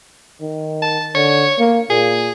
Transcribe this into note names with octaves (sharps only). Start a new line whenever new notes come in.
D#3
A5
D3 C#5
A#3
A#2 G#4